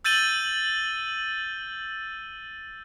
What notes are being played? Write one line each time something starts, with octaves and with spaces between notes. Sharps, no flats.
E6 G6 A6 D#7 F#7 G7